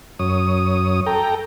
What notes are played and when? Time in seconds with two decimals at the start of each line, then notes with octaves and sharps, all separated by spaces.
0.19 F#2 C#5 D#6
1.06 A4 G5 A#5